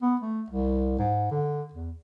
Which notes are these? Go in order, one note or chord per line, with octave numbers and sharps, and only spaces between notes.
B3
A3
C2
G#2
D3
E2